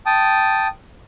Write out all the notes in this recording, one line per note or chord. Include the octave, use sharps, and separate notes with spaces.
G5 A5 D#6